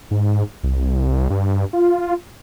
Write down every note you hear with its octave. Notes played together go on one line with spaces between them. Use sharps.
G#2
C2
G2
F4